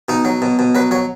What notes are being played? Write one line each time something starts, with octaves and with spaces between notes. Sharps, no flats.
B2 D#4
F#3
B2
B2
F#3 B4
F#3 C#5